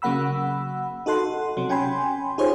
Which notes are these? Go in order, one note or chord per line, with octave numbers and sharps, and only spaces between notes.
C#3 F#3 A#3 F#5 B5 E6
D#4 F#4 A4 F#5 C6
C3 F#3
C#4 G5 G#5 B5 C6
D#4 F4 G4 G#4 C5 C#5